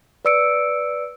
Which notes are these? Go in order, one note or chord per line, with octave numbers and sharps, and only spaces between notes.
B4 D5 E6 C#7 D7